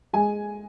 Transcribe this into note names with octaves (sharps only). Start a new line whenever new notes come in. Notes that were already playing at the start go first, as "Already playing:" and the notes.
G#3 G#5